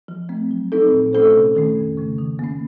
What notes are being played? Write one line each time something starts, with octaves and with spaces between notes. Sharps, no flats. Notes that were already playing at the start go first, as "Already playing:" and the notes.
F3
A3 C4
F#3
C4 D#4 A4
A#2
A3 C#4 A4 C5
C3
D#3 A3 C#4
F2
C#3 A3
D#3
A#3 C#4